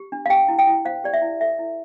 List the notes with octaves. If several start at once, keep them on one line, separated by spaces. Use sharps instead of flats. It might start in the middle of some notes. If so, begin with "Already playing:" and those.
Already playing: G4
D4
F5
G4 G5
E4
G5
E4
C5 F5
G4 D5
E5
E4
A4 E5
E4